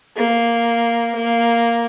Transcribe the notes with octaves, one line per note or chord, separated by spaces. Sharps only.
A#3
A#3